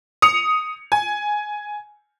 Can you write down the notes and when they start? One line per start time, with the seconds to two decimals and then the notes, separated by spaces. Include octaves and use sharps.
0.22 D#6 C#7 F7
0.92 G#5